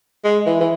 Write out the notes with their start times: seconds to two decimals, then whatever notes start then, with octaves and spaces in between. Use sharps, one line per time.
0.24 G#3
0.46 E3
0.60 E3